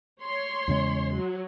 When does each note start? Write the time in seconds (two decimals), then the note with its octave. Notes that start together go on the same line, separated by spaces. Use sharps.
0.21 C#5 C6
0.68 E2 C#3 G#3
1.14 F#3